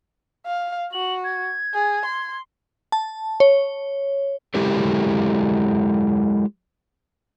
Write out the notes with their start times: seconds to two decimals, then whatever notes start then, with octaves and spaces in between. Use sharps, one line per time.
0.46 F5
0.93 F#4 F#7
1.24 G#6
1.74 G#4
2.05 C6
2.92 A5
3.40 C#5
4.54 F#3 G#3 E4 G4 A4 A#4